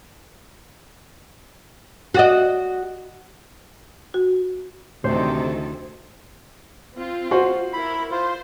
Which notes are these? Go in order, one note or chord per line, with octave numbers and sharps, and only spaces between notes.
F#4 D5 D#5
F#4
D2 C3 D#3 E3 A4 C5
C4 F4
F#4 C5
E4 A#4 B5
F4 C5